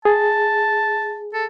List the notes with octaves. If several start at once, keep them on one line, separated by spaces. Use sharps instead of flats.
G#4 A5
A4